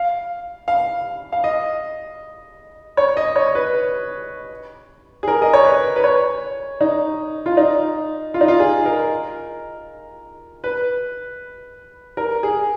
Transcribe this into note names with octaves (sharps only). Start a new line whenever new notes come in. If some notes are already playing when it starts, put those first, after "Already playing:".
Already playing: F5
F5
F5
D#5
C#5
D#5
C#5
B4
G#4
A#4
D#5
C#5
B4
B4
C#5
D#4
F4
D#4
F4
D#4
F4
G#4
A#4
B4
A#4
G#4